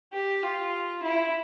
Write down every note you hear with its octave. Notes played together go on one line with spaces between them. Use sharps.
G4
F4
E4